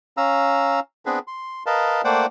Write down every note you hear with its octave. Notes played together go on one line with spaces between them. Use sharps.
C#4 F5 A#5 E6
B3 C4 D4 G#4 B4
C6
A#4 B4 D#5 F5 A5
A3 A#3 C5 D5 F#5 G5